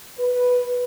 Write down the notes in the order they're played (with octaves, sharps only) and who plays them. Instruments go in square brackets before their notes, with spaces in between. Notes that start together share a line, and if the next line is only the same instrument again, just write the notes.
[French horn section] B4